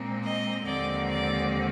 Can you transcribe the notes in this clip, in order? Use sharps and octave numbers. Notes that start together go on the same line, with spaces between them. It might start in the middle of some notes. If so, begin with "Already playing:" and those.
Already playing: A#2 G#3 C4
D#5
D#2 D3 F3 G#3 C4 D5
D5